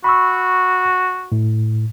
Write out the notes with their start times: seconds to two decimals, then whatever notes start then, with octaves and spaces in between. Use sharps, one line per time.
0.04 F#4 B5 C#6 E6
1.32 A2